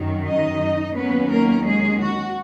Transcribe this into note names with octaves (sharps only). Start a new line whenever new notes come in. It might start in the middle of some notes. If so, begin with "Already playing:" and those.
Already playing: F#2 D#3 F#3
D#4 D#5
D#2 D#3 F#3 A#3 B3 C#4 B4
A#3 A#4
G#3 G#4
F#4